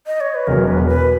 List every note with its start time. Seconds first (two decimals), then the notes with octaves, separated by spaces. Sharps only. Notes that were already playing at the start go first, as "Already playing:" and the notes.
0.07 D#5
0.21 C#5
0.34 B4
0.47 E1 E2 B2 F#3 A#4
0.67 B4
0.88 B4